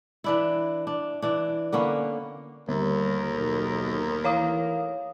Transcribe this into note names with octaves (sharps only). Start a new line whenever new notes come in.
E3 D4 E4
D4
E3 D4
D3 A#3 B3 C#4
D#2 G#2 D3 G3 A3 A#4
B1
E3 C#5 F5 D#6